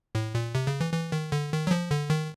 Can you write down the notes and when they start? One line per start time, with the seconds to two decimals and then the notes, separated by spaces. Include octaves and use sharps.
0.15 A2
0.35 A#2
0.55 C3
0.67 C#3
0.80 E3
0.93 E3
1.12 D#3
1.32 D3
1.52 D#3
1.67 F#3
1.71 F3
1.91 D3
2.10 D#3